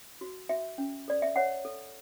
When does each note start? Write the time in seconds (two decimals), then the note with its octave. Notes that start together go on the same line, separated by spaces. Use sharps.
0.21 F#4
0.49 F#4 E5
0.78 C#4
1.08 A4 D5
1.22 E5
1.36 C#5 F#5
1.65 A4